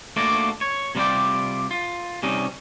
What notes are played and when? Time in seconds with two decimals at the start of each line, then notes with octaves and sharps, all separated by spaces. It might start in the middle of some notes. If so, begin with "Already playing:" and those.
0.16 A3 A#3 D4 F4 F#4 D5
0.61 C#5
0.95 C3 G3 F4 D5 G5
1.71 F4
2.23 C3 G3 C#4 D#4